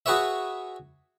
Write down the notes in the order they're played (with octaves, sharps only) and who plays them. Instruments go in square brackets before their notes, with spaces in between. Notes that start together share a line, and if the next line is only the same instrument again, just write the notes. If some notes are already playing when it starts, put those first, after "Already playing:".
[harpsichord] F#4 G#4 B4 C#5 E5